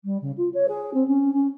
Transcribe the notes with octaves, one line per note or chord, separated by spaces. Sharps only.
G3
C#3
F4
C#5
G#4
C4
C#4
C#4